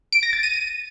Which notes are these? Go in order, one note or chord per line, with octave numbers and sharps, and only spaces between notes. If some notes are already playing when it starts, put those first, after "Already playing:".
D7
A#6
A6
D#7